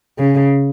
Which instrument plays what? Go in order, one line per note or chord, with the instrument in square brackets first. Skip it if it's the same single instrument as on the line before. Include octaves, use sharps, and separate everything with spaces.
[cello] C#3